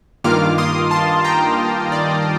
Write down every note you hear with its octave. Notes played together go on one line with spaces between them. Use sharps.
G2 D#3 A#3 F4 D6 F6
C6 D#6
A5 C6
G5 A#5
D5